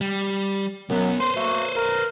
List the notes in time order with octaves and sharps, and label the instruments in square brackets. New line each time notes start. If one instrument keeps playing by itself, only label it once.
[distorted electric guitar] G3
[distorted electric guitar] B1 B3 [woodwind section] F#2 F#3
[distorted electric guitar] B4 C5 [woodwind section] C6
[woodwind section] A3 A#3 F#4
A#4